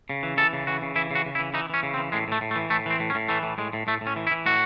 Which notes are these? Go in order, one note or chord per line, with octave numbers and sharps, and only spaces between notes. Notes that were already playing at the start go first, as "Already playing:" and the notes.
C#3
E3
E3 A4
C#3
E3 F#4
C#3
E3 E4
C#3 F#4
C#3
E4
E3
E3 D#4
E3 C#4
C#3
C4
E3
A2 G#3
A2 A3
A2
A3
E3
A2 A3
E3 C4
A2
C#4
A2
E3 A3
A2
A2 G#3
A2
A2 A3
A2
C#4
E3
E4
E3
A2 F#4